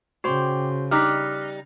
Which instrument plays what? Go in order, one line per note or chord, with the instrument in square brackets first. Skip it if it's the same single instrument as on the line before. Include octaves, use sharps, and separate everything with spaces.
[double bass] C#3 [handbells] F#4 C5 C6 [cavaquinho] D5 G5
[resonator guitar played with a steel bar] G3 D#4 [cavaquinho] D6 D#6 [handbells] F6 F#6 B6